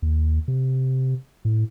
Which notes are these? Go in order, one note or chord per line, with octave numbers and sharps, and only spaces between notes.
D#2
C3
A2